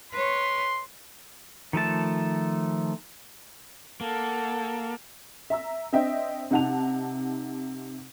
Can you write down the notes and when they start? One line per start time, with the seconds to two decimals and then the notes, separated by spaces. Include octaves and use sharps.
0.12 B4 C#5 C6
1.73 D#3 F3 A3 A5
4.01 A#3 A4 F#5
5.50 E5 A#5 E6
5.93 C4 D4 D#5 E5 G5
6.51 C3 D#4 F#5 A5 F7